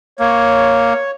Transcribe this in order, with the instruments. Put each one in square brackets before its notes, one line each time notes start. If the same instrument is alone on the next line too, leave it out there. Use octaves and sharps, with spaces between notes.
[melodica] A#3 [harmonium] C#5